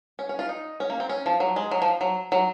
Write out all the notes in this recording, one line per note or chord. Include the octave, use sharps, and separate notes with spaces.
C#4
C#4
F4
D#4
C#4
A#3
C4
C#4
F3
F#3
G#3
F#3
F3
F#3
F#3